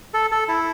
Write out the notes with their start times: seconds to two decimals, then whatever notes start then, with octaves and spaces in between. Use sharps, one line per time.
0.14 A4
0.32 A4
0.48 E4